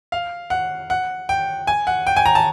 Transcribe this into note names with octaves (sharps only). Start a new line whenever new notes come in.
F5
F#5
F#5
G5
G#5
F#5
G5
G#5
A#5
A5